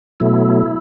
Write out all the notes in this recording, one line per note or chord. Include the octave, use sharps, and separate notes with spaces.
B2 F#3 A3 E4